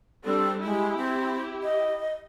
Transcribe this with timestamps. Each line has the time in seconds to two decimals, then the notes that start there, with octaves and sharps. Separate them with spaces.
0.25 G3 C4 D4 A4
0.64 G#3 E4 G4
0.97 C4
1.63 D#5